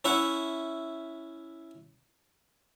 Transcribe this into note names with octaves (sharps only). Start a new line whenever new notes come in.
C#4 E4 E5 F#5